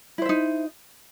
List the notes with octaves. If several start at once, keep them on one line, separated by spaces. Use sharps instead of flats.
D#4 E4 C5 E5